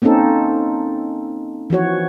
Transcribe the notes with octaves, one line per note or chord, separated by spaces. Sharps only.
A#3 C4 C#4 D#4 A4
E3 F3 F#4 C#5